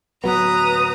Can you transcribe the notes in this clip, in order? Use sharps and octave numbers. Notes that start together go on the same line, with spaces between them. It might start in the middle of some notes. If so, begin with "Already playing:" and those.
D1 F#3 B3 B4 A#5 D#6